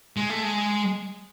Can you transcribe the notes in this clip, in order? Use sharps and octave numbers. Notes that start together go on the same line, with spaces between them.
G#3
A3
G#3